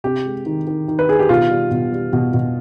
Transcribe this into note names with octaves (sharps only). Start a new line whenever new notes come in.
C3 G4
G#3
D#3
D#3
D#3
B4
D#3 G#4
G4
B2 F4
G3
B2
G3
B2
B2